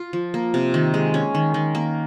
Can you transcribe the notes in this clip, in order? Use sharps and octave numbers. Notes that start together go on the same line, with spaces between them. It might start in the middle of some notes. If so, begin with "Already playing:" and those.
Already playing: F4
F3
A#3
C3
D#3
G#3
C#4
D#3
D#3
A#3